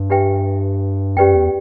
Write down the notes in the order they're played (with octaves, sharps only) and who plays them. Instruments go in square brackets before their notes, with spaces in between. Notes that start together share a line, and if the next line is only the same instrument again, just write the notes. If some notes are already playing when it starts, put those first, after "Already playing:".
Already playing: [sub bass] G2
[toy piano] D4 G4 B4 E5 G5
[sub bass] F#2 [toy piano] C#4 G4 B4 D5 G5
[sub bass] E2